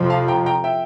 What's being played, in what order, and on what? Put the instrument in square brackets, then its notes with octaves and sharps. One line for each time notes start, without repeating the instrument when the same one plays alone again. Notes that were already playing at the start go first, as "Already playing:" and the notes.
Already playing: [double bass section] F2 C3 F3
[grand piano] F5 A5
G5 A#5
G5 A#5
E5 G5